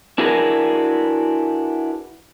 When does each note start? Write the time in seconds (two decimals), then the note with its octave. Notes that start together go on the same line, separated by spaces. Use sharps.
0.18 D4 E4 F#4 G#4 A#4 B4